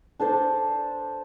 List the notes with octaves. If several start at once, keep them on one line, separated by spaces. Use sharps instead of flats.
D4 A4 C5 D5